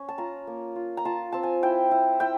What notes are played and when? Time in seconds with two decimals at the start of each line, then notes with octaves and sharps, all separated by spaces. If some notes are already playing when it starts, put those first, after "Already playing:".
Already playing: C#4
0.08 A5
0.18 F4 A#5
0.47 A#3
0.76 F4
0.97 A#5
1.05 F4 A5
1.32 C4 A5
1.43 G#5
1.63 E4 G5
1.91 E4
2.20 E4 G5